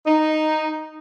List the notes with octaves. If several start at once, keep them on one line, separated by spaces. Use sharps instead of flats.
D#4